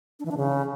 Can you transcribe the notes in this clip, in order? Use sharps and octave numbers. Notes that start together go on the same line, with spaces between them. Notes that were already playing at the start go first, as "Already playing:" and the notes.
D4
E3
D4
C#3